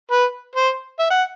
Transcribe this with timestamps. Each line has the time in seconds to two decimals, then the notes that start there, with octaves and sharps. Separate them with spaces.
0.11 B4
0.56 C5
0.99 E5
1.11 F#5